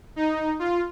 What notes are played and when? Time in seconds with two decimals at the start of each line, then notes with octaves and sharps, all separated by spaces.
0.16 D#4
0.59 F4